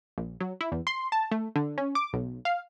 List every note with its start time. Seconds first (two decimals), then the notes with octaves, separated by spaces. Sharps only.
0.18 A#1
0.40 F#3
0.61 E4
0.72 E2
0.87 C6
1.12 A5
1.31 A3
1.56 D3
1.78 C#4
1.95 D6
2.13 B1
2.45 F5